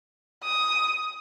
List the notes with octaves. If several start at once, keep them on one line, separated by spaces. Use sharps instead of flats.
D#6